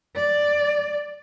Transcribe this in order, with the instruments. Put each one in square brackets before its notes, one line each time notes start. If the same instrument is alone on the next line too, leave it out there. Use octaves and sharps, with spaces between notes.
[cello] D5